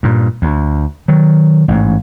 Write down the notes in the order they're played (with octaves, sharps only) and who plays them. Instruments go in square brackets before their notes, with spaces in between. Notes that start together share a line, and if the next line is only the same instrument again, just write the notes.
[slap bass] G2 A#2
D2
D#3 F#3
A1 G#2